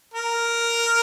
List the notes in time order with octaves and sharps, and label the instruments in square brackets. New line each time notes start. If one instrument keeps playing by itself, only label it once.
[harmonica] A#4